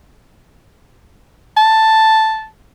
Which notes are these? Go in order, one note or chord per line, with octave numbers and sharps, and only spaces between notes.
A5